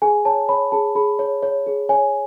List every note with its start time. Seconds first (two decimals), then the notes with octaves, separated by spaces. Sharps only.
0.02 G#4 G#5
0.25 C#5 A5
0.49 C#5 B5
0.72 G#4 A5
0.95 G#4 B5
1.19 C#5
1.43 C#5
1.66 G#4
1.89 C#5 G#5